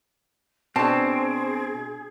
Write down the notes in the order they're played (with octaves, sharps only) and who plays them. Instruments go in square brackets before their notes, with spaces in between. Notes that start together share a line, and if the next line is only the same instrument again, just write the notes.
[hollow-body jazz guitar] B2 [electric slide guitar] C4 [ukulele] D4 A5 [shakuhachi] G#4